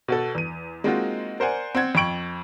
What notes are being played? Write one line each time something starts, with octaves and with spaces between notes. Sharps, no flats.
B2 F#4 A4
E2 D#7
G#3 A#3 C4 D#4 F4 F#4
A#4 C5 D5 F#5 G#5
C4 C5 F#5 G#6
F2 G5 C#6 D7 F#7